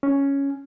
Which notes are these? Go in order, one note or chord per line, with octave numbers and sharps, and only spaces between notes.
C#4